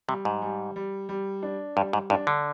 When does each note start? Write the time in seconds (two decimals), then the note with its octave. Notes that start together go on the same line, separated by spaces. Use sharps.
0.08 C3 G3
0.25 G#2
0.42 G3
0.76 G3
1.09 G3
1.42 D4
1.77 G2 G3
1.93 G#2
2.10 G2 D4
2.27 D3